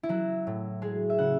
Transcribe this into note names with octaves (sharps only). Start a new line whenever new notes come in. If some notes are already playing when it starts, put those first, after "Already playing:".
E4
F#3 F#4
A2
G#3 G#4
E5
C#3 F#5